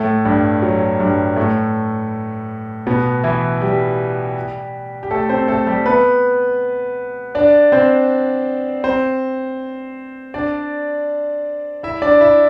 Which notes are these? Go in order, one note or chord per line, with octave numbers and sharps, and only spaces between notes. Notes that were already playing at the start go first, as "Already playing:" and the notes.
Already playing: A2 A3
G2 G3
F#3
G2 G3
A2 A3
B2 B3
E3 E4
G3 G4
G4
A3 A4
C4 C5
A3 A4
G3 G4
B3 B4
D4 D5
C4 C5
C4 C5
D4 D5
E4 E5
D4 D5
E4 E5